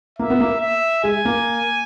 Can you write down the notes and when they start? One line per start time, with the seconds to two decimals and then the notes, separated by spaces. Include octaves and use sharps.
0.19 A#3 E5
0.30 B3
0.40 A#3
0.61 E5
1.04 G#3 G#5
1.25 A#3